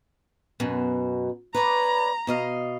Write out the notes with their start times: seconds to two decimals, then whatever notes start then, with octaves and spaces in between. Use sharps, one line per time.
0.60 F#2 B2
1.54 B4 C#5 D5 A#5
2.27 B2 D#5 F5